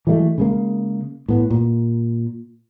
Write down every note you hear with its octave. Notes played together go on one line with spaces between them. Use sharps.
E3 F#3 G#3 A3
C#3 G#3 A#3
A2 B3
A#2